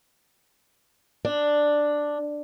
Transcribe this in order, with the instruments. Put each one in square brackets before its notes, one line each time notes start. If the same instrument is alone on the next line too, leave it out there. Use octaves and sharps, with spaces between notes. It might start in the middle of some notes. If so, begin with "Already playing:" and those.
[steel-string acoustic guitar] D4